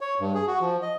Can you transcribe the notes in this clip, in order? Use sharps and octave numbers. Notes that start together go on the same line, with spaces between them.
C#5
G2
G#4
F#4
F3
D#5